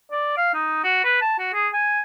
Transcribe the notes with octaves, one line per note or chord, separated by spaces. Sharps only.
D5
F5
D#4
F#4
B4
A5
F#4
G#4
G#5